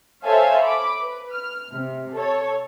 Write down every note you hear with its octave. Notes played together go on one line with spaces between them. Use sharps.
A4 C5 C#5 E5 F5 G#5
B5 D6
B4
F6
C3
A4 C#5